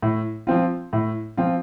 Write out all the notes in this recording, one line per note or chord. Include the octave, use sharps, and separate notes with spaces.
A2
F3 C4 F4
A2
F3 C4 F4